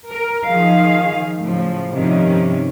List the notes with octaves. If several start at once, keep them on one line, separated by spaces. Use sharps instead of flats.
A#4
D#3 F3 G#4 F5
A2 C#3 F3
G2 C3 D#3 F3 C#4 D#4